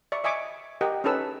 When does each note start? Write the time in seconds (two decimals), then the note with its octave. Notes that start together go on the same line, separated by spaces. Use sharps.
0.12 D5 E5 C#6
0.24 D#5 E5 G#5 C#6 D6
0.81 G4 A#4 D#5 F#5
1.04 C#4 D#4 G#4 A4 B4 E6